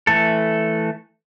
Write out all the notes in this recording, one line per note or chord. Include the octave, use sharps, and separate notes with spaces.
E3 A3 A4